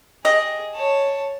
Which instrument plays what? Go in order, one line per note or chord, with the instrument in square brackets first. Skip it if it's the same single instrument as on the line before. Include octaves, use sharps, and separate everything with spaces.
[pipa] G4 D#5 [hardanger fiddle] G#4
[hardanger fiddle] C#5 A5